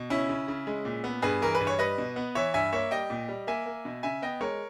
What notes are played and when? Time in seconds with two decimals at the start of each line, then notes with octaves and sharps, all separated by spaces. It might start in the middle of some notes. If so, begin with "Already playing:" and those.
Already playing: B2
0.10 C#3 C#4 E4
0.29 C#3
0.48 C#3
0.67 G#3
0.85 A#2
1.04 B3
1.22 G2 G#4 B4
1.42 E3 A#4
1.55 B4
1.60 G2
1.67 C#5
1.79 G3 B4 D#5
1.98 B2
2.16 B3
2.35 E3 C#5 E5
2.54 G2 E5 G#5
2.72 A#3 C#5 E5
2.91 G3 D#5 G5
3.10 A#2
3.28 G3
3.47 A#3 E5 G#5
3.66 A#3
3.85 B2
4.03 C#3 E5 G#5
4.22 B3 D#5 G5
4.41 G#3 A#4 C#5